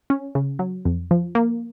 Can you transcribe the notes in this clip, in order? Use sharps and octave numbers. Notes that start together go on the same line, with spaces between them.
C#4
C#3
F#3
F2
F3
A#3